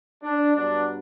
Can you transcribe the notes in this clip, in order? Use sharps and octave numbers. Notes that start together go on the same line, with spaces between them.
D4
G2 F#3 B3 D4